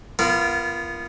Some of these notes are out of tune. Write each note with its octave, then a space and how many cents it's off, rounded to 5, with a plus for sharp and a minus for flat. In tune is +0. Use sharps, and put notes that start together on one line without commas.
B3 -5 F4 -30 A#4 +0